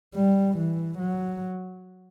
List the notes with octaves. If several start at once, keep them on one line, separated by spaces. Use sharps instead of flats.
G3
E3
F#3